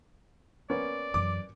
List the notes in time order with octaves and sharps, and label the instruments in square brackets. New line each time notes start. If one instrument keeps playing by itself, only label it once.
[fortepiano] A#3 B3 C#4 [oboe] D5
[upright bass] F#2 E3 [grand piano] D6